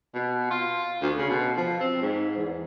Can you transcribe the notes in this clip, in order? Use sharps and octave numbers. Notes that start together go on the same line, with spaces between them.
B2
F4
D2
C#3
B2
F3
C4
G#2
E2